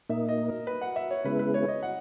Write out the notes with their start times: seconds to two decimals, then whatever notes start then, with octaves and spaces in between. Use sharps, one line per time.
0.09 A#2 A#3 D#4 E5
0.29 D#5
0.48 A#4
0.67 B4
0.81 F#5
0.96 E5
1.11 C#5
1.25 C#3 G#3 B3 E4 B4
1.39 B4
1.54 C#5
1.68 D#5
1.83 F#5